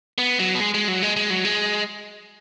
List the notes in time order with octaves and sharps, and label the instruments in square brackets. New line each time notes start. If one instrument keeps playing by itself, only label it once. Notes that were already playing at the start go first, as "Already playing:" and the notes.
[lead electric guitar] B3
F#3
B3
G#3
G#3
F#3
G#3
G#3
F#3
G#3